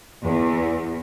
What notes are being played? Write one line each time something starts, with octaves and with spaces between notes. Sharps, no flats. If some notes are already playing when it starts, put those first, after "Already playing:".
E2